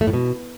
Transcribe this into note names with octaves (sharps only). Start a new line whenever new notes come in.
A3
A2
B2